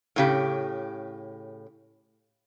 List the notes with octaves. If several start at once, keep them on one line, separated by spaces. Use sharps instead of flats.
A2 C#3 G4